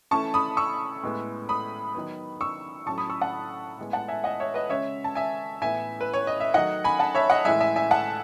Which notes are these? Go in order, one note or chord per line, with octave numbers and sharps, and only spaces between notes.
E3 A3 C#4 A5 C#6
B5 D#6
C#6 E6
A2 G#3 B3
B5 D#6
D#3 F#3 B3
C#6 E6
A2 F#3 A3 C#4 A5 C#6
B5 D#6
C#6 E6
F#5 A5
A2 G#3 B3
F#5 A5
E5 G#5
D#5 F#5
C#5 E5
B4 D#5
C#3 G#3 C#4 C#5 E5
A5
E5 G#5
A2 E3 B3 E5 G#5
B4
C#5
D#5
E5
D#3 F#3 A3 D#5 F#5
G#5 B5
F#5 A5
C#5 E5
D#5 F#5
A2 E3 G#3 E5 G#5
E5 G#5
E5 G#5
F#5 A5